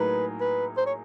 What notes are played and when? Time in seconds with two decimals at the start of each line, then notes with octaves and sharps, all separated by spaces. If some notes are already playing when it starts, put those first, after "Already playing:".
Already playing: A2 F#3 A#3 D#4 G#4 B4
0.40 B4
0.77 C5
0.86 C#5